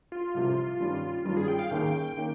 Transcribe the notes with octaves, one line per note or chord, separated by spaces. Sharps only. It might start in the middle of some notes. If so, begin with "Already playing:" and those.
F4
C2 C3 F3
G2 D#3 G3 C#4
G2 D#3 G3 C#4 F4
G#4
G5
F5
D#2 D#3 A#3 C#4 G#4 G5
D#3 A#3 C#4